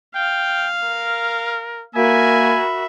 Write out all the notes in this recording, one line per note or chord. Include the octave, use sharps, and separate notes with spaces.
F5 G5
A#4
A#3 F#4 A#4 E5 G#5 B5